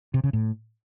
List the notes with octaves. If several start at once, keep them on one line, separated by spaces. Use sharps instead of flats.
C3
C#3
A2